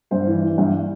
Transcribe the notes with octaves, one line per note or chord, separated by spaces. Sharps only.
G2 C5
E3
E3
G2